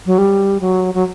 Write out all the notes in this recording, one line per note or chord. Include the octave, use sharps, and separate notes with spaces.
F#3
G3
F#3
F#3